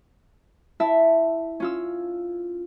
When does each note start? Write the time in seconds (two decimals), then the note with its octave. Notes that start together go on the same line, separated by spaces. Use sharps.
0.80 E4 E5 A5
1.60 C#4 F4 E6